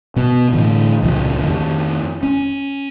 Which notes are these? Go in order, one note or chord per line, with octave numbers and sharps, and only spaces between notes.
B2 B3
A2 D3 E3
C#2 A#2 C#3 F3
F2 D#3
C#4